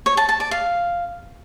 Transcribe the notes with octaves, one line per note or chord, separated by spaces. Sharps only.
C#5
A5
A5
D5
F5